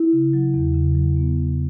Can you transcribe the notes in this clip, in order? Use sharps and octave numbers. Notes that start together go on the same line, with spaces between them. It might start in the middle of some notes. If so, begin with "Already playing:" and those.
Already playing: E4
C#3
F#3
E2
C#3
F#3
B3
C#3